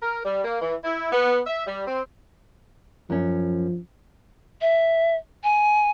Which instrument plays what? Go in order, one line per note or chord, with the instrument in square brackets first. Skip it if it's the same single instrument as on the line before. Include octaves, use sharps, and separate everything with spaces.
[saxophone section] A#4
G3
A#3
E3
E4
B3
E5
G3
C4
[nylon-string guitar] F#2 C#4 [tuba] F3
[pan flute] E5
G#5